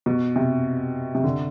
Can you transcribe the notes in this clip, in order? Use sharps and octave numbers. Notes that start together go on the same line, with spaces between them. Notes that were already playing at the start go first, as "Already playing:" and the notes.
B2
C3
C3
D3